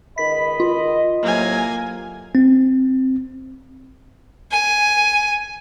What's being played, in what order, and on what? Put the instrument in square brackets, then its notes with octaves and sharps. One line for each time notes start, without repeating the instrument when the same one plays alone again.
[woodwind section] C#2 D#3 B5 [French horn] D#5 [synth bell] B6
[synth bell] F4
[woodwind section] A2 C3 F#3 [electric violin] A#3 G#5
[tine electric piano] C4
[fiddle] G#5